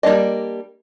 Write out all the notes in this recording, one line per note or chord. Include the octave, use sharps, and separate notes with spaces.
G3 A#3 C4 D4 D#5